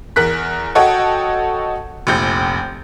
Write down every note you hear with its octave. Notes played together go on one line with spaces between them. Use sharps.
E2 A#4 F#6 B6
F#4 A4 C#5 D#5 F#5 G5
F1 A#1 G6